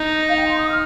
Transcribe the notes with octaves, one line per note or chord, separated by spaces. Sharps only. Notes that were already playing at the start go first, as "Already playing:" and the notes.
Already playing: D#4
F5
G5
C6
D#6
F6